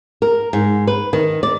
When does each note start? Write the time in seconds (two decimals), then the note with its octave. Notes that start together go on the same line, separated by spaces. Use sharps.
0.22 A#4
0.53 G#2
0.87 B4
1.13 D#3
1.43 D5